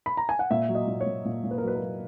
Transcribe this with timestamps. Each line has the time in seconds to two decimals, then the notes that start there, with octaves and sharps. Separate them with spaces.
0.06 B5
0.17 A#5
0.29 G#5
0.39 F#5
0.51 A#2 E5
0.69 F#3
0.75 D#5
0.87 A#2
1.01 C#5
1.06 A#2
1.25 A#2
1.44 A#2
1.51 B4
1.58 A#4
1.63 F#3 B4
1.75 A#4
1.82 F#3